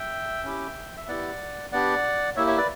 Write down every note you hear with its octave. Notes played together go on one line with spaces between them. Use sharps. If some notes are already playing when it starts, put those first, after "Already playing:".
Already playing: E5 G5
C#4 E4 G4
E5
B3 E4 G4 D5 F#5
B3 D4 G4 D5 F#5
A#3 E4 G4 C#5 E5
C#5 E5
B4 D5